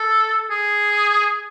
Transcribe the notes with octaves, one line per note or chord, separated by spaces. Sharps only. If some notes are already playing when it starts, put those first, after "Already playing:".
Already playing: A4
G#4